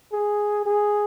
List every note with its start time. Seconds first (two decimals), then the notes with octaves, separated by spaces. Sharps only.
0.12 G#4
0.65 G#4